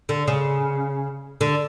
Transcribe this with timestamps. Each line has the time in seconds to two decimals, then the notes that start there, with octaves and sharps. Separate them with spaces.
0.09 D3
0.28 C#3
1.41 D3